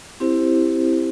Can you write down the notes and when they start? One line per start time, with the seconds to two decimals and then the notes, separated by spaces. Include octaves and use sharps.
0.20 C4 E4 G4 C5